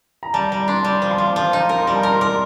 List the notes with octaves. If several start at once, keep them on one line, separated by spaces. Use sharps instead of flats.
A#5
G3 A5
G3 A#5
D4 C6
G3
F3
C6
F3 D6
C6
F3
D#4
A#4
C6
G3 A#5
A5
A#4 A#5
C6
A#4 D6